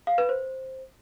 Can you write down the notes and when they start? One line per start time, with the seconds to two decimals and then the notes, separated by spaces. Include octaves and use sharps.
0.07 F5
0.18 B4
0.29 C5